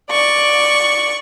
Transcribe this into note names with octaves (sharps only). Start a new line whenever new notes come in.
D5 C#6